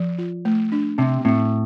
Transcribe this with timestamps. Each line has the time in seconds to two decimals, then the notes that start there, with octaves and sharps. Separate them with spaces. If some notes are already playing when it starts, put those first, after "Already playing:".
Already playing: F3
0.18 F4
0.45 A3
0.72 D4
0.98 C3 C4
1.25 A2 C4